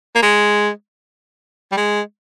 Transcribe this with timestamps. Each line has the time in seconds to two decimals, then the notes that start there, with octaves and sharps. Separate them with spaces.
0.16 A#3
0.23 G#3
1.72 G3
1.77 G#3